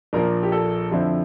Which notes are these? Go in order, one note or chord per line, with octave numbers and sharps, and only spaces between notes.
A#1 A#2 F3 A#3 A#4
G4
A4
F2 D3 F3 C4 E4